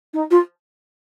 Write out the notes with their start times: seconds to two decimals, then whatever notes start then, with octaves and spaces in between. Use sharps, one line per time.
0.14 D#4
0.31 F4